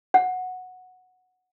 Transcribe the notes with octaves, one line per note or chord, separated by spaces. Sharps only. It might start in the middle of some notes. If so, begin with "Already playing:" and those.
F#5